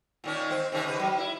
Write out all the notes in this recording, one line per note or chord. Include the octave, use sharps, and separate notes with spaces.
A#2 D#3 C#4
C4
C3 D#3 C#4
C#3 B4
F#3
E4